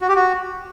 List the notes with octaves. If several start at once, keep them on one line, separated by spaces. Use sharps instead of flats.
F#4
G4
F#4